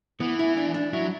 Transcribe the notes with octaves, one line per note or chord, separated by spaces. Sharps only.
E3 B3
E4
D4
D4
F#3 E4